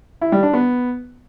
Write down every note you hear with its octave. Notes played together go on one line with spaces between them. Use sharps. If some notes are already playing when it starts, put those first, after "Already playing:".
E4
G3
D4
B3